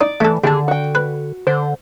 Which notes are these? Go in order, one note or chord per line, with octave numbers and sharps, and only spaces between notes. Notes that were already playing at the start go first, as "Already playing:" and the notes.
D#4 D5
E3 A3 A4
D#2 D3 G#4 A5
F#4 G5
B4
D3 C5